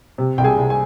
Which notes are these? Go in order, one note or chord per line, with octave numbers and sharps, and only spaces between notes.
C3
C2 G5
G#4 G#5
C2
G#5